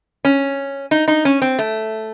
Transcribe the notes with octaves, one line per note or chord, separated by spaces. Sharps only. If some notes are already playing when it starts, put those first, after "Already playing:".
C#4
D#4
D#4
C#4
C4
A3